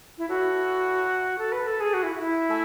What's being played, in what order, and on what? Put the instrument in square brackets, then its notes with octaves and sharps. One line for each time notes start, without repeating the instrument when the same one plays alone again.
[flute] E4
[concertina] E4 A4 C#5 E5 [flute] F#4
[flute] A4
B4
A4
G#4
F#4
E4
E4
[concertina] A3 A4 E5 G#5